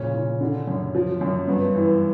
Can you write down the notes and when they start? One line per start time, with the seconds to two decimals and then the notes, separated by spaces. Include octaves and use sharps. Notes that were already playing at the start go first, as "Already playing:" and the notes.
Already playing: A#2 C#3 F3 C#4
0.14 A#2
0.41 D3
0.67 F#2
0.95 F3
1.21 F#2
1.48 G2 B3
1.75 E3